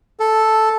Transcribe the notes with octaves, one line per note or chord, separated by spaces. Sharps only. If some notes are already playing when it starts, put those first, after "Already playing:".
A4